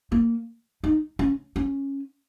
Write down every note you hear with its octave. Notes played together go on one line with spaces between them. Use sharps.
A#3
D#4
C#4
C#4